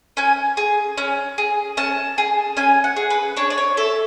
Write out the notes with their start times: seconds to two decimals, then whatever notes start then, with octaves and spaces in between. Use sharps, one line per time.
0.17 C#4 G#5
0.57 G#4
0.98 C#4
1.38 G#4
1.77 C#4 A5
2.18 G#4
2.57 C#4 G#5
2.84 F#5
2.97 G#4
3.10 B4
3.36 D4 C#5
3.50 D5
3.58 C#5
3.77 A4 E5